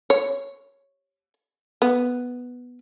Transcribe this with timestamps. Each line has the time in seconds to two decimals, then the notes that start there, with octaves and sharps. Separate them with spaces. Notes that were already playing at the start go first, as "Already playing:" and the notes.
0.10 C#5
1.82 B3